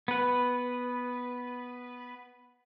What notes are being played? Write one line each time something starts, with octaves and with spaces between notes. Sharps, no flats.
B3 B4